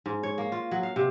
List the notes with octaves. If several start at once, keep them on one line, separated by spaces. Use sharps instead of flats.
G#2
C#5
A#3
F4
F#3
F5
C3